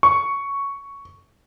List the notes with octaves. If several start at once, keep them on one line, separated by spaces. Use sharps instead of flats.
C#6